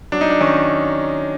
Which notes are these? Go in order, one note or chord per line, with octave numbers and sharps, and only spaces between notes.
F#3 D4
D#4
D4
D#3 C#4